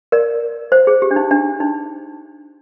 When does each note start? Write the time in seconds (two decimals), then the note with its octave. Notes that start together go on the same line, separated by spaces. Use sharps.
0.12 A#4 D5
0.72 C5
0.87 G#4
1.02 G4
1.11 D4
1.16 D#4
1.31 D4
1.60 D#4